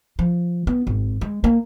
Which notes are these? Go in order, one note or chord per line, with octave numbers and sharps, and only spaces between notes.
F3
B3
G#1
G#3
A#3